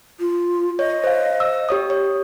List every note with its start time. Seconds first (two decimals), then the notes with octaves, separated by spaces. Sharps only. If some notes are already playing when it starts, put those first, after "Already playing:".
0.20 F4
0.79 C#5 D#5
1.04 C5 F5
1.40 E6
1.69 G4 C#5 D#6
1.90 C#5